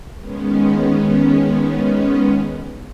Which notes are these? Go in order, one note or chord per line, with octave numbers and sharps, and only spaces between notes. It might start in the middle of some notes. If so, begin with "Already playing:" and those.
D#3 G#3 B3 C#4